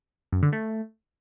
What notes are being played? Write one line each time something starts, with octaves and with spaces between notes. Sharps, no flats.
F#2
D3
A3